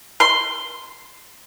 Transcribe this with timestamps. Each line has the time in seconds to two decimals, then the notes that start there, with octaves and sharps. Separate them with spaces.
0.20 C6